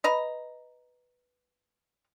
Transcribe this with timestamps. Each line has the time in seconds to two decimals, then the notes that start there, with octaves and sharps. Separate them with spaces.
0.04 B4 D#5 A#5